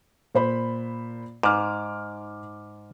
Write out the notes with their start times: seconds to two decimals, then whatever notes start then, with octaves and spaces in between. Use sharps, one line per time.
0.35 A#2 C5 B5
1.43 G#2 D6 F6